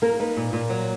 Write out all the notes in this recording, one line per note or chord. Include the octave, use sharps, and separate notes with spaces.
A#3 A#4
D#4 B4
A#2
A#2
F#3